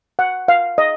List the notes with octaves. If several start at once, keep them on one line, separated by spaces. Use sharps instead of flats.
F#5
F5
D#5